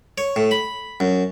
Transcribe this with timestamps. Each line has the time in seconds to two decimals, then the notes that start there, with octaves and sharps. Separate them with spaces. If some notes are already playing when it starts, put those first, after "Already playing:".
0.18 C#5
0.36 A2
0.51 B5
1.00 F#2